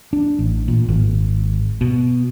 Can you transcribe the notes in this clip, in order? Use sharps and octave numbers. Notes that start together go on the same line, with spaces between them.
D4
A1
A#2
G#1
B2